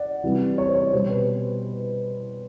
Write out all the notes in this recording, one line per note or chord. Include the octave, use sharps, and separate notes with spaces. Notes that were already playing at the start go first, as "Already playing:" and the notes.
Already playing: D5 F#5
C3 E3 G3
C#5
C5
C#5
B2 G3 C5
B4